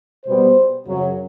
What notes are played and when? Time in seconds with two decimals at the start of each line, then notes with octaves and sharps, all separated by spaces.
0.25 B2 G3 B3 C5
0.85 F#2 C#3 F#3